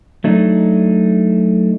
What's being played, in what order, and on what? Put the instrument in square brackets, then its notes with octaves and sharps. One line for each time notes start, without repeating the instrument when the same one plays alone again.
[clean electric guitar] F#3 A3 D4 D#4